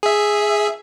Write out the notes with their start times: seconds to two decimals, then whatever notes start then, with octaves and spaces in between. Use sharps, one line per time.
0.03 G#4 E5